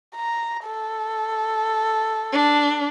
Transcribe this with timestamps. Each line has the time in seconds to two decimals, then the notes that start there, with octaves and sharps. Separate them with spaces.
0.16 A#5
0.65 A4
2.33 D4